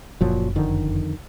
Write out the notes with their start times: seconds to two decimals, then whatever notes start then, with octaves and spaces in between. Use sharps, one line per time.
0.21 F#1 A#2 F3 F#3
0.56 F2 D3 D#3